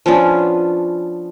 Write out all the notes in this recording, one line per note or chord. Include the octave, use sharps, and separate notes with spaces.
F3 B3 C#4 D4